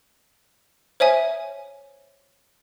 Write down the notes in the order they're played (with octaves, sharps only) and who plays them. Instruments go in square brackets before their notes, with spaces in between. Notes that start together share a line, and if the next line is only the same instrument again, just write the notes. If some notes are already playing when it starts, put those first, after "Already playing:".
[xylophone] C5 C#5 E5 G#5